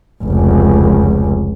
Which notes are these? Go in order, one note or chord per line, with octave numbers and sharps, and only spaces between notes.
F1 C#2